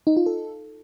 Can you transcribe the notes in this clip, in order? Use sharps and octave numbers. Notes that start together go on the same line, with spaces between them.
D#4
F4
A4